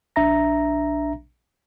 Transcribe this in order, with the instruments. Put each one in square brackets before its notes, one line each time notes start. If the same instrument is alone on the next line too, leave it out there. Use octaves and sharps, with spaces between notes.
[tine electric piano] A#1 D4 E5 A#5 A#6